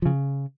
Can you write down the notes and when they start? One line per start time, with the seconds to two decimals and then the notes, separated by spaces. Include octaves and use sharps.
0.02 F3
0.06 C#3